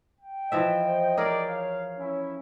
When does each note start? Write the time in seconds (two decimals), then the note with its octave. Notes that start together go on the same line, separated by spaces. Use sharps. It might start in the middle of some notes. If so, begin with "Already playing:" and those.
0.21 G5
0.52 E3 F3 D#5 E5
0.83 C5
1.17 G#4 A#4 C#5 D5 G5
1.49 F5
1.99 C#4 E4